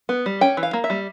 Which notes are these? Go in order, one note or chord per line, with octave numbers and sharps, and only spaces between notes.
B3
G3
C#4 G5
E3
F5
A#3
E5
G3